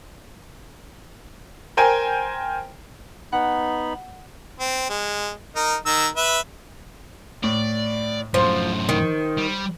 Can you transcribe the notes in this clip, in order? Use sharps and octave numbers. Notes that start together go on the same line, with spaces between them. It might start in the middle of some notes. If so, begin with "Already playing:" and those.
A#4 C5 G5 G#5
B3 D#4 F#5 B5
C4
G#3
D#4 A#4
D#3 A#5 E6
B4 E5
A2 D5
F#2 A2 F3 C5 C6
D#3
G3